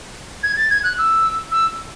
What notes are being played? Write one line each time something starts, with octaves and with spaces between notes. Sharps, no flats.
G#6
A6
G#6
F#6
E6
E6